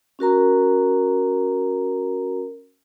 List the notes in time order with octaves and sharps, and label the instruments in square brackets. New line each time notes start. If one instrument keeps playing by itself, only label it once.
[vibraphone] C#4 F#4 A#4 A#5